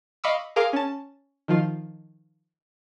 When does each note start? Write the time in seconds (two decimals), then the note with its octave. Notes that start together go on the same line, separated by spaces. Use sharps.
0.24 D#5 F5 B5 C#6 D6 E6
0.56 G#4 A#4 F5 C6 D6 F6
0.73 C#4 A5
1.48 D#3 F3 F4